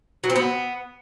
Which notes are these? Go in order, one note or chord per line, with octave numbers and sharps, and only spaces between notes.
F#3
C4
B3